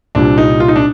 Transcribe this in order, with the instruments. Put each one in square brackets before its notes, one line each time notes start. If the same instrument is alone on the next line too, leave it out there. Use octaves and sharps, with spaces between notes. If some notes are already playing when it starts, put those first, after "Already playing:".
[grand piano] C2 A#2 G3 D4
D#4
F4
D#4
D4